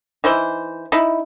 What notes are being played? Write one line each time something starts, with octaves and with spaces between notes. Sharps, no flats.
E3 D#4 E4 C5
D#4 E4